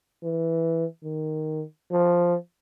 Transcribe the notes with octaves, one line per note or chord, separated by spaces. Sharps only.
E3
D#3
F3